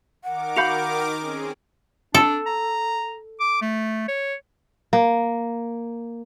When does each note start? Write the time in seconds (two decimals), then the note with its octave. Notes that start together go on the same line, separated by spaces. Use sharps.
0.24 D#3 A#4 F#5 D6
0.56 F#4 F5 B5 G6 C#7 F7
1.19 C4 C#4 G#4
2.15 D4 A4
2.46 A#5
3.40 D6
3.62 A3
4.08 C#5
4.93 A#3